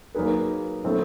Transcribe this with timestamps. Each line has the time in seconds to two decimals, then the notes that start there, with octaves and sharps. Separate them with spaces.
0.15 F#3 A#3 D#4 G#4 B4
0.84 D3 F#3 A3 C4 E4